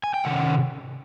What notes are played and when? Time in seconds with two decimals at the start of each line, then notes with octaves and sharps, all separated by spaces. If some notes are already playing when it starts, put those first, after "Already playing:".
0.04 G#5
0.14 G5
0.25 C3 D#3 C#4 F#5